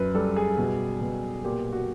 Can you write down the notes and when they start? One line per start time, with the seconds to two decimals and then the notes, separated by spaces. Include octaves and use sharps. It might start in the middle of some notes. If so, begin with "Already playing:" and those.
Already playing: F#2 B4
0.14 G3 A4
0.36 G#4
0.58 B2
1.01 B2
1.44 A#2 G4
1.73 F#4